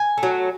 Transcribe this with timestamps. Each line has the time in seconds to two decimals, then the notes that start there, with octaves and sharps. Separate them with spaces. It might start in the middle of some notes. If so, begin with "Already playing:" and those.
Already playing: G#5
0.18 A3
0.23 F#3